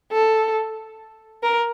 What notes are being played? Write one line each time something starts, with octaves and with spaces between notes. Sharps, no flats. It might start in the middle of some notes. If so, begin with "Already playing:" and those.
A4
A#4